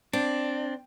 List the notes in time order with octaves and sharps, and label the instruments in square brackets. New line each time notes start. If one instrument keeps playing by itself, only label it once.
[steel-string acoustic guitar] C4 [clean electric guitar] D4